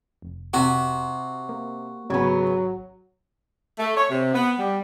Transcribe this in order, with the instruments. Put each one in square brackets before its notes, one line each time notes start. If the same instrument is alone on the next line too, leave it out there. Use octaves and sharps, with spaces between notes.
[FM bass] F1
[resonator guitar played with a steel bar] C3 [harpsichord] F#4
[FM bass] A#3
[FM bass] G#1 [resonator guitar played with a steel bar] C#3 B3 [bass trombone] F#3
[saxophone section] A3
C#5
C3
B3
G3